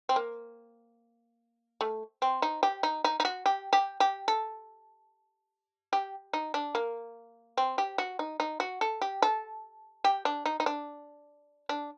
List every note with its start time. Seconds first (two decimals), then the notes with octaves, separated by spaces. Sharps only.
0.09 C4
0.16 A#3
1.81 A3
2.22 C4
2.42 D#4
2.63 G4
2.83 D#4
3.04 D#4
3.20 D#4
3.25 F#4
3.46 G4
3.73 G4
4.00 G4
4.28 A4
5.93 G4
6.33 D#4
6.54 D4
6.75 A#3
7.57 C4
7.78 G4
7.98 F#4
8.19 D#4
8.40 D#4
8.60 F#4
8.81 A4
9.01 G4
9.22 A4
10.04 G4
10.25 D4
10.46 D#4
10.60 D#4
10.66 D4
11.69 D4